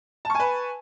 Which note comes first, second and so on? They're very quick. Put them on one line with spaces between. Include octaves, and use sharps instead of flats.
A5 C#6 G#5 B4